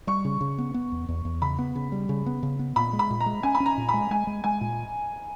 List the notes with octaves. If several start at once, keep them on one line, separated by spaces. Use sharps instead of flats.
G3 C#6
C#3
C#3
B3
B3
E2
E2
E2
C#3 B5
B3
C#3
G3
C#3
B3
C#3
B3
A#2 B5
G#3
B5
A#2
A#5
G#3
C#4 G#5
B5
C#4
A#5
A#2
B5
G#3
G#3 G#5
G#3
G#3 G#5
A#2